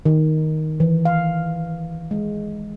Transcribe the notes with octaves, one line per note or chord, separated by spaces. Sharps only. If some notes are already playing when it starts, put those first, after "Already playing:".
D#3
E3
F5
G#3